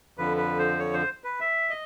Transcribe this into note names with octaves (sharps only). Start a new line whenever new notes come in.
F2 D3 F3 B4
B4
C5
C#5
C5
B4
E5
D#5